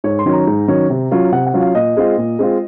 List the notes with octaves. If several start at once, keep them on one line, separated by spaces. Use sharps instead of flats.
G#2 C#5
C6
D#3 F#3 C#4
A#5
G#2
D#3 F#3 C#4
C3
F#3 C#4 F4
C3 F#5
F#5
F#3 C#4 F4
F5
A#2 D#5
G#3 C4 F4
A#2
G#3 C4 F4